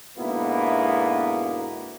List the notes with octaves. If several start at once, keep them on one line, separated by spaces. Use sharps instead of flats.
G#2 B2 D3 A#3 B3 E4